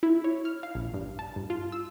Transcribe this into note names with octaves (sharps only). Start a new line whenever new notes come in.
E4
C#5
F6
F5
A#1
G2
A5
G2
F4
E6